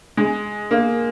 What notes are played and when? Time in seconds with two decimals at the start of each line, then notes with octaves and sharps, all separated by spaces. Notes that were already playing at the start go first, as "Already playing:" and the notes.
0.17 G#3
0.71 A#3